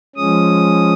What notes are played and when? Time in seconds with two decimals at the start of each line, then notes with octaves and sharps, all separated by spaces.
0.16 F3 G#3 C#4 D#6